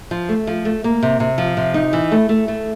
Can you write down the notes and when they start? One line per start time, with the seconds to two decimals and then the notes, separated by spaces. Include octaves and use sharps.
0.11 F3
0.29 A3
0.47 F3
0.65 A3
0.84 A#3
1.03 C3
1.20 C3
1.38 F3
1.57 C3
1.74 D#4
1.93 E3
2.11 A3
2.29 A3
2.48 A3